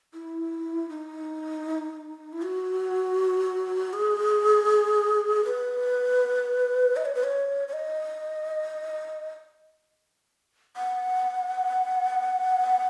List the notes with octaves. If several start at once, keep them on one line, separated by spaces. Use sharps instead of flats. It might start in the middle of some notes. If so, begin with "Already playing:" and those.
E4
D#4
E4
F#4
G#4
B4
D#5
C#5
B4
C#5
C#5
D#5
F#5